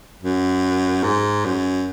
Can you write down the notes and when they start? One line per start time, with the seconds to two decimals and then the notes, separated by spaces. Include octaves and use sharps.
0.23 F#2
1.04 G#2
1.45 F#2